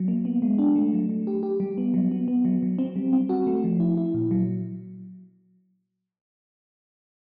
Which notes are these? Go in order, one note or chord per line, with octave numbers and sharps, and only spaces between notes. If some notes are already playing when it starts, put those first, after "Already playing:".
Already playing: F#3
A#3
B3
G#3
D4
A3
F#3
A3
G4
G4
G3
B3
F#3
B3
B3
F#3
F#3
C4
G3
C4
F#4
A3
F3
E4
E4
A#2
F#3